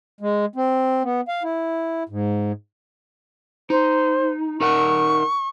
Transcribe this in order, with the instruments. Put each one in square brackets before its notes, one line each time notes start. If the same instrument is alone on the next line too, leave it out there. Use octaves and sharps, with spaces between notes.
[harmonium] G#3
C4
B3
F5
E4
G#2
[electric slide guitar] D#4 [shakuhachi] C5
[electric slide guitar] D#4 A#4 F#5 [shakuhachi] C#6